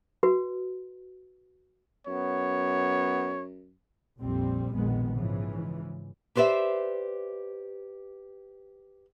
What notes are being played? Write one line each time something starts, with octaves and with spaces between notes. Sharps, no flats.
F#4 B4
F#2 B3 C#5
A#1 F2 A#2 G3 C4
A#1 F2 B2 D#3 G#3 B3
G#2 C#3 E3 F3
G4 B4 C5 D5 E5